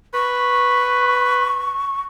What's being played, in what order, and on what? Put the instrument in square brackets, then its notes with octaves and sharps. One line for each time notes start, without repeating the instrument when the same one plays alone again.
[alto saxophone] B4 [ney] C#6